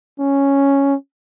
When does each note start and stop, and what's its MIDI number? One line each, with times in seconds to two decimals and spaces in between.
0.20 0.95 61